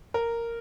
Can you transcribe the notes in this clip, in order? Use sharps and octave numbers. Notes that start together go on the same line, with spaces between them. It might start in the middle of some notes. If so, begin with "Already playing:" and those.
A#4